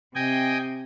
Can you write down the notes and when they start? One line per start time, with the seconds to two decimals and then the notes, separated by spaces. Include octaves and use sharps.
0.15 C3 D#5 G5 G#5